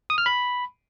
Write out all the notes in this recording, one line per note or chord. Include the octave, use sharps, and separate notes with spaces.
D#6
F6
B5